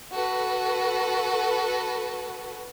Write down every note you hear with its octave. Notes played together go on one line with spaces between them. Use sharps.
F#4 A4 B4